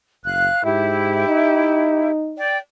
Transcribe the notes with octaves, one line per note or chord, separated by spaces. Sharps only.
F#1 F5 F#6
G#2 E4 G4
D#4
D5 G5